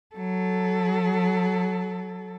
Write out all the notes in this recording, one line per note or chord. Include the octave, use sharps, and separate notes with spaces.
F#3 A4